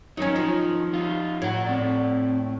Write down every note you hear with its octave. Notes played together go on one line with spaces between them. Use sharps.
F#3 C#4 D#4 A#4
F3
D#4 F4
A2 C#5 F#5
C4 D5